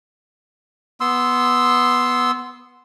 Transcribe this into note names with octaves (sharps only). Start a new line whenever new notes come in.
B3 C6 E6